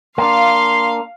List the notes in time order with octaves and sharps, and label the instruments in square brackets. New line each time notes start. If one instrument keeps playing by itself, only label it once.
[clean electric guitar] A#3 D4 [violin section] F5 [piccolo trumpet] C6